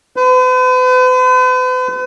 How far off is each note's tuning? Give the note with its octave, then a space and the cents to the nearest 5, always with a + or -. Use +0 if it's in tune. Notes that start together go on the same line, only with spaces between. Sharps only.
B4 +45